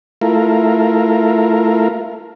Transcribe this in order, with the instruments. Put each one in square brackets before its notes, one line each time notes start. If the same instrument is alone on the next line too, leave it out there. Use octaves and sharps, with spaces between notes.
[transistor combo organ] A3 E4 F4 A#4